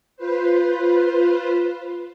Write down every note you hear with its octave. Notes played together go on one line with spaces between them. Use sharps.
F4 B4 C5